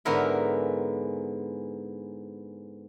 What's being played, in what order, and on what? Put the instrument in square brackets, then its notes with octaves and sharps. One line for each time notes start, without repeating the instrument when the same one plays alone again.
[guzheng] G#2 D3 B3 E4 A#4 B5